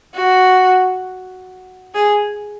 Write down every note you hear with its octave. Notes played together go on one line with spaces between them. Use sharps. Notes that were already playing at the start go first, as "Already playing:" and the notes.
F#4
G#4